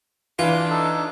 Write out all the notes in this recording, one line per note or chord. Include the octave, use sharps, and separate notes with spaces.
E3 D4 E4 F4
D#4 A4